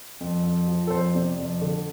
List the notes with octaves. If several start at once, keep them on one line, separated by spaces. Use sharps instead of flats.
F2
F2
F3
A4
F2 C5
C3 D5
F2 D5
D3